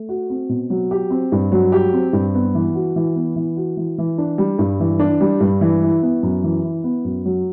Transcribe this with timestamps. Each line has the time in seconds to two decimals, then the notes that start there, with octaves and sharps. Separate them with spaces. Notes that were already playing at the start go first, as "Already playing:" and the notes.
Already playing: A3
0.09 F#4
0.30 C4
0.49 B2
0.70 F#3
0.91 G4
1.10 C4
1.32 G2
1.52 F#3
1.72 G4
1.93 C4
2.13 G2
2.34 B3
2.55 E3
2.75 F#4
2.96 E3
3.16 B3
3.36 E3
3.57 F#4
3.77 E3
3.98 E3
4.18 D4
4.38 G3
4.59 G2
4.80 E3
4.99 D4
5.21 G3
5.40 G2
5.61 E3
5.82 E4
6.03 B3
6.23 F#2
6.44 E3
6.64 E4
6.84 B3
7.04 F#2
7.26 F#3